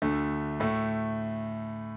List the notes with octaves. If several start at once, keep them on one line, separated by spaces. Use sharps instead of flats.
D2 D3 A3
A2 A3